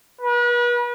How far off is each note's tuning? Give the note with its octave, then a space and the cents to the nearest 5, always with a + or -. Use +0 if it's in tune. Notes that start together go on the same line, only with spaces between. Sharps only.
B4 -40